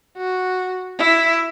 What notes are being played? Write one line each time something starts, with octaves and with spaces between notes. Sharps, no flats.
F#4
E4